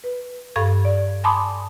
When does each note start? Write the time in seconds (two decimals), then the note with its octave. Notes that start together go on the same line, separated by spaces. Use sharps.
0.04 B4
0.56 G2 A4 F5 C#6 G#6
0.85 D5
1.24 G#5 A5 B5 C6 D6 D#6